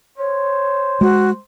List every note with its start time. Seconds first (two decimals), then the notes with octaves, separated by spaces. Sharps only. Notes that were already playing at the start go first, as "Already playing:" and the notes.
0.18 C5 C#5
1.01 G#3 F#4